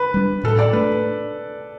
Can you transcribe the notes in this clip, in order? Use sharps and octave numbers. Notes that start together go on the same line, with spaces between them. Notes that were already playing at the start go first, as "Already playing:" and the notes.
Already playing: B4
G3 D4
A2 A4
D5
A3 D4 B4